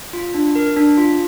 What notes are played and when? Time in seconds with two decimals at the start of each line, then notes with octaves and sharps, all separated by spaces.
0.13 F4
0.34 D4
0.56 A#4
0.77 D4
0.97 F4